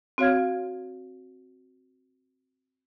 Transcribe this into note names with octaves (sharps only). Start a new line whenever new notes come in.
C4 F#4 C#5 F5 F6 G#6